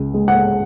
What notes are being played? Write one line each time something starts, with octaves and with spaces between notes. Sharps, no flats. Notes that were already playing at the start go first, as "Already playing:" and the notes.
Already playing: C#2
G#3
F#5